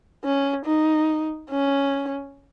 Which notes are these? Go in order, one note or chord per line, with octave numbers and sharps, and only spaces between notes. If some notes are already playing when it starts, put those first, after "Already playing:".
C#4
D#4
C#4